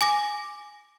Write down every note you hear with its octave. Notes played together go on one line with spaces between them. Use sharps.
G#5 D6 A#6